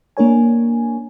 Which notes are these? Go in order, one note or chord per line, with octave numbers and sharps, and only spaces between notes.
A#3 D4 A#4 C#5 G#5